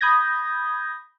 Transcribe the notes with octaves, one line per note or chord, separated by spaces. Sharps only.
B5 D#6 G6 G#6 A#6